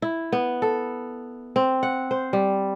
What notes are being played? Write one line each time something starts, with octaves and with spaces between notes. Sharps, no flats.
E4
B3
A4
C4
F#5
C5
G3